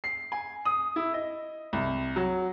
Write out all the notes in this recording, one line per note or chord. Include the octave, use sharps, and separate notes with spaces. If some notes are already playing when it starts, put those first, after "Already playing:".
C7
G#5
D#6
E4
D#5
C2
F#3